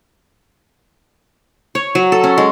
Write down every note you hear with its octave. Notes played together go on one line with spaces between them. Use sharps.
C#5
F#3
A4
C#4
G#3